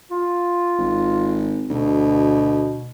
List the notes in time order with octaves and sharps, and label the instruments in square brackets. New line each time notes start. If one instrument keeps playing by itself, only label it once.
[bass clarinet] F4
[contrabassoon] G#1
[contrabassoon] D2 [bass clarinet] B2